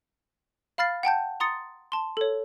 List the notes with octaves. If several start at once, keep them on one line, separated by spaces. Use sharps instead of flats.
F5 B5 F6 A6 C7
F#5 G5 A5 G6
A#5 C6 D#6 A6 C#7
A5 C6
A4 C#5